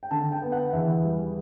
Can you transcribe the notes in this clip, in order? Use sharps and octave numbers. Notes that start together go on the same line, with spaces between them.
G5
D3 A5
G5
B3
F#5
E2 E5
G3